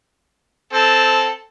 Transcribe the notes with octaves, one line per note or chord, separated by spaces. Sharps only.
C4 A4